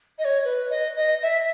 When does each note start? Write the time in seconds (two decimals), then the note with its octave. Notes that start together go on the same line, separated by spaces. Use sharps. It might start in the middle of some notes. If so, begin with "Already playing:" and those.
0.19 D#5
0.25 C#5
0.45 B4
0.70 D#5
0.97 D#5
1.23 E5